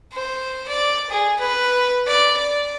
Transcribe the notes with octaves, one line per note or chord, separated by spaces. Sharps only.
C5
D5
G#4
B4
D5
D5